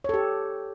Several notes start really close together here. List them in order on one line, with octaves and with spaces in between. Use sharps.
C#5 A4 G4